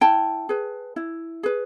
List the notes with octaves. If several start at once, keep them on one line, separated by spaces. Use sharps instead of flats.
E4 G5 A5
G#4 B4
E4
G#4 B4